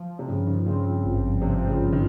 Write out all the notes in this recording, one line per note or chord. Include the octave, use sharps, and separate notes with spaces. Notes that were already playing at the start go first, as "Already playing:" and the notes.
Already playing: F3
C3
G2 C#3
D#3
C#3 C4
G#1
C3 F3
C#3
G2
D#3